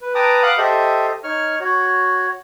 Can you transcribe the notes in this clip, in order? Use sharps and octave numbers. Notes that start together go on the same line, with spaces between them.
B4
B4 G5 A5 A#5 D6 D#6
F5 F#5 B5 D6 D#6 F#6
G4 A4 C5 D#5 E5
D#4 C#5 C#6 F6
F#4 C#5